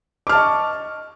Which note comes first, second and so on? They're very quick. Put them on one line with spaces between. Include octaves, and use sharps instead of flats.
D6 F6 A5 D#5 C#6